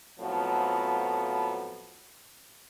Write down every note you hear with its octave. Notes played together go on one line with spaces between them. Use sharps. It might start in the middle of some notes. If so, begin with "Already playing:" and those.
F2 A2 F3 F#3 B3